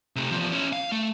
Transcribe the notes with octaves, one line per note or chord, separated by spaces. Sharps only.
C3 A3
E2 F3
C#4 E4
F5
A3